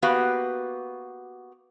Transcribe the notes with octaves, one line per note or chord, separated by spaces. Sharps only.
A#3 B3 F#4 G4 B4 F5